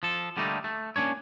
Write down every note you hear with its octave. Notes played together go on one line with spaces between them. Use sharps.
F3 A4
D3 G3 A3 A#3 D#4
A3
A#3 C#4 D4 C#5